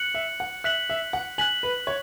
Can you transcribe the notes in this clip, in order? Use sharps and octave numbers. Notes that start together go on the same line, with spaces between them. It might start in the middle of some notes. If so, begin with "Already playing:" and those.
Already playing: F#6 C#7 F#7
E5
F#5
E5 F#6 B6 F#7
E5
F#5
G#5 F#6 B6 F#7
B4
C#5